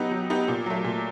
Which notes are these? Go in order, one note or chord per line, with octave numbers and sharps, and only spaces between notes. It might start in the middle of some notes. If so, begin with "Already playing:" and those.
Already playing: F#3 B3 D#4 G4
F#3
B3 D#4 G4
A#2
F#3 A3
A#2